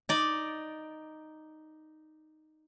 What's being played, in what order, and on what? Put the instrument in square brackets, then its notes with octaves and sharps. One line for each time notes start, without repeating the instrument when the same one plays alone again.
[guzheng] D#4 D5